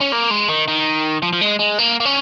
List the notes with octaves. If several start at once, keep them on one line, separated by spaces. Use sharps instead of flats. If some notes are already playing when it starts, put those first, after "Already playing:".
C#4
A#3
G#3
D#3
D#3
F3
F3
G#3
G#3
A#3
A#3
C#4